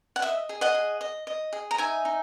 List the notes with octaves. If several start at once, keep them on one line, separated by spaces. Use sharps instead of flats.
F#5
D#5 E5
G#4
D#5 F#5
G#4
D#5
D#5
G#4
A#5
D#4 E5 G#5
D#4